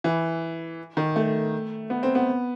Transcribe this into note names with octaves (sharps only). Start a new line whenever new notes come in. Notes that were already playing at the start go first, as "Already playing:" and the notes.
E3
D#3
A3
B3
C4
B3